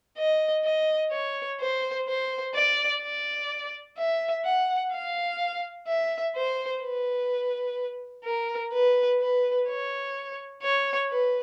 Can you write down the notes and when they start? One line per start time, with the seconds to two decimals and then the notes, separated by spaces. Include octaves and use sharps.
0.18 D#5
0.64 D#5
1.12 C#5
1.60 C5
2.08 C5
2.55 D5
3.02 D5
3.98 E5
4.45 F#5
4.92 F5
5.87 E5
6.35 C5
6.83 B4
8.24 A#4
8.73 B4
9.21 B4
9.68 C#5
10.62 C#5
11.10 B4